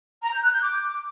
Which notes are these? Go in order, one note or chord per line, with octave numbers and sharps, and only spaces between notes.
A#5
G6
F#6
G6
D6